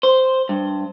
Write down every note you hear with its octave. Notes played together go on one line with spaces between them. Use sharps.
C5
G2